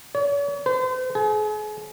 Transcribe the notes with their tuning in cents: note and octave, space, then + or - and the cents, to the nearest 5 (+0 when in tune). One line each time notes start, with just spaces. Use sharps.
C#5 +45
C5 -40
G#4 +40